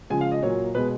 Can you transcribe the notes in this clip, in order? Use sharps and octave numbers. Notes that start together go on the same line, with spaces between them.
C#3 F3 G#3 G#5
F5
D#5
A#2 F#3 A#3 C#5
B2 G#3 B4